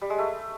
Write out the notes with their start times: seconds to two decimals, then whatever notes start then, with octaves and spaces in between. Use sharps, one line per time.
0.02 G3
0.10 G#3
0.18 A3